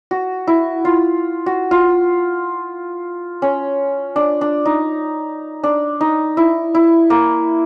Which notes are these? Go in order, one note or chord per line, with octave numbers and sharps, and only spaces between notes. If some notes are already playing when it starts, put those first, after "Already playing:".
F#4
E4
F4
F#4
F4
C#4
D4
D4
D#4
D4
D#4
E4
E4
A#3